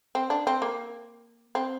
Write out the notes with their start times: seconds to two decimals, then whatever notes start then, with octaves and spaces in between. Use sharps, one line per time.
0.15 C4
0.30 D4
0.47 C4
0.62 A#3
1.55 C4